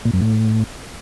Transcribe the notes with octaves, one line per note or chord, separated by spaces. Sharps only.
A#2
F#2
A2